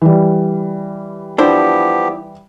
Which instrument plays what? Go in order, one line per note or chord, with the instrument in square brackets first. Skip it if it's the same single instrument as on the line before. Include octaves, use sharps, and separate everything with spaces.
[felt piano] E3 G3
[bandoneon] F3 B3 G4 [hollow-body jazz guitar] D4 E4 C5